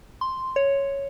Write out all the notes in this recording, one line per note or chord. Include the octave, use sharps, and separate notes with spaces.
C6
C#5